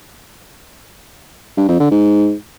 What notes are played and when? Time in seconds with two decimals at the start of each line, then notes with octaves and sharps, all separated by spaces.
1.57 G2
1.69 F2
1.80 D3
1.91 G#2